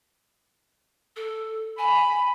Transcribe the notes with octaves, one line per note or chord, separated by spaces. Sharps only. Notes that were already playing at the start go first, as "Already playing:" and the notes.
A4
G#5 B5